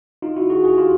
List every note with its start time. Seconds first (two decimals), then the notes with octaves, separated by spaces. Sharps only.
0.22 D#4 F4
0.36 E4 F#4
0.50 F#4 G#4
0.64 F#4 G#4
0.77 F4 G4